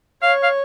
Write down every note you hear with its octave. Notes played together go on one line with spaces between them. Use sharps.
C#5 F5
F5